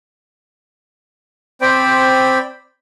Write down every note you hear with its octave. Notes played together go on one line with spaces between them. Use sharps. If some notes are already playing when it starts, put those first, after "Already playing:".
C4 C5 D5 G5 B5